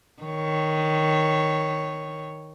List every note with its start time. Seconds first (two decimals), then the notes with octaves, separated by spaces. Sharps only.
0.23 D#3 C#5